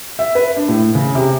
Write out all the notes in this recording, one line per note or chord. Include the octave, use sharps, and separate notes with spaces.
E5
B4
D4
A2
C#3
C3